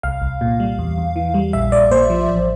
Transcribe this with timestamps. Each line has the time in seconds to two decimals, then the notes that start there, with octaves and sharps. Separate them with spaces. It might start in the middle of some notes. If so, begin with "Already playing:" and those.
0.03 C2 F5
0.22 C2
0.41 A#2
0.60 G3
0.78 E2
0.98 E2
1.16 E3
1.34 G3
1.53 A#1 E5
1.72 A#1 D5
1.90 A#2 C5
2.10 F3
2.29 A1